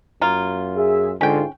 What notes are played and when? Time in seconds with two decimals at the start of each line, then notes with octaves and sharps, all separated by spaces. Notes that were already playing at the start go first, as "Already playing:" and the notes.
0.21 F#2 A#3 F4
0.76 G#4 E5
1.21 G#2 D3 C#4 F4 G5